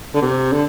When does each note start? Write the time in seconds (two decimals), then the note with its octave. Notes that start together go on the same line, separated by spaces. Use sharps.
0.15 D3
0.22 C3
0.52 D3